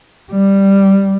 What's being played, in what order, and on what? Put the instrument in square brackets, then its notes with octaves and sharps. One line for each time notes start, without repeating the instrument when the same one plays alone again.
[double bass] G3